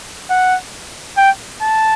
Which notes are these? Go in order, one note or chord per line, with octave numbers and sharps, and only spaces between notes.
F#5
G5
A5